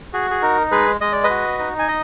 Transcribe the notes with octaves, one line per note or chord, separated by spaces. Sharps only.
F#4 G#4
G#4
D#4 A#4
G#3 G#4 B4
G#3 D#5
D5
B4 D#5
F#4
D#4
G#5
D#5